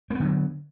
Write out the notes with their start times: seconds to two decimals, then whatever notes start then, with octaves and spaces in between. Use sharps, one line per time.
0.10 A#3
0.15 B3
0.20 D3
0.24 F#3